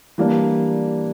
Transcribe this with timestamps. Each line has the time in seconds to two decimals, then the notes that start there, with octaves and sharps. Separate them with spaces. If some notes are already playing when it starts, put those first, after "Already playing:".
0.18 E3 G3 A#3 D4